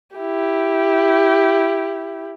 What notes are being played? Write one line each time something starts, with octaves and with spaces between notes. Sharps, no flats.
E4 G4